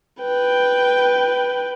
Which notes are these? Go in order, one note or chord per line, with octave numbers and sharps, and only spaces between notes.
B4 G5